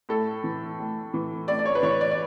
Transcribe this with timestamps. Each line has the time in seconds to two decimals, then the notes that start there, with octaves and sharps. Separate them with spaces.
0.09 A2 A4
0.44 E3
0.79 A2
1.14 E3
1.48 A2 D5
1.59 D5
1.66 C#5
1.75 B4
1.83 E3 C#5
2.01 D5
2.11 D5